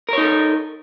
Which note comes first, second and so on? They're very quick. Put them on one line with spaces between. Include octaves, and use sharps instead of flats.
A#4 C#5 D#4 A4